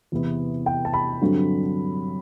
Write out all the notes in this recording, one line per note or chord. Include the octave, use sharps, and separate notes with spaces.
E2 C3 E3 B3 E4
G5
A5
B5
G2 D3 F#3 C4